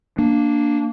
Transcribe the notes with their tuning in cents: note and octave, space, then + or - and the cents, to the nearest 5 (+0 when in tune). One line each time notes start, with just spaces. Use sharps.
A#3 +0 D4 +0